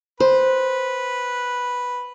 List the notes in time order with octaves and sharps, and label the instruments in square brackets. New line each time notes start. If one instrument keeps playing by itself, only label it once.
[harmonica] B4 [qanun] C5